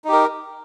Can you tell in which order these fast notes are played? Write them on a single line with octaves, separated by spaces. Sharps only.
D#4 G4 A#4